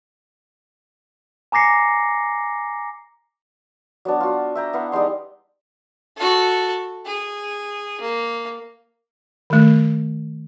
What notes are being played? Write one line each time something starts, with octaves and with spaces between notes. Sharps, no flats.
G#5 A#5 D6 A#6 C7 C#7
F#3 B3 D4
F4 F#4
E5 G5 A#5
B3 E4 F5 F#5
G3 G#3 D#4 C6
F#4 A4
G#4
A#3
D#3 A3